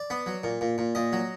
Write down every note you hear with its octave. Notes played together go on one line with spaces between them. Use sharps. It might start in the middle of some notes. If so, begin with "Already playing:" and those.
Already playing: D5
B3
F#3
A#2
A#2
A#2
A#2 D#5
F#3